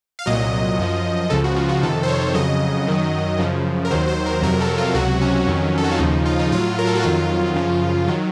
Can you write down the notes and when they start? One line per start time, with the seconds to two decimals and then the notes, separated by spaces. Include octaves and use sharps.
0.19 F5
0.26 C2 A#2 F#3 D#5
0.79 F#2 F3
1.30 C#2 C#3 F3 A4
1.44 F#4
1.56 F4
1.69 F#4
1.83 F2 C3 D#3 A4
2.03 C5
2.08 C#5
2.34 F2 C#3 F#3 D#5
2.87 F#2 D#3 F#3
3.39 F#2 C#3 F3
3.85 A#4
3.91 D#2 D#3 F#3 C5
4.08 C5
4.26 A#4
4.43 F2 C3 F#3 A#4
4.61 A4
4.78 F4
4.95 C#2 C3 F#3 F#4
5.21 C#4
5.47 F2 D#3 F#3
5.78 A4
5.84 F#4
5.92 F4
5.99 D#2 C#3 F3 D#4
6.26 F4
6.39 D#4
6.51 A2 F#3 F4
6.79 A#4
6.87 A4
6.95 F#4
7.02 F2 D#3 F#3 F4
7.54 F#2 C#3 F3
8.08 D#3 F#3